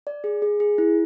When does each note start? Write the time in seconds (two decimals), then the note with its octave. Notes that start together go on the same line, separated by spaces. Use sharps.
0.07 D5
0.24 G#4
0.42 G#4
0.60 G#4
0.78 E4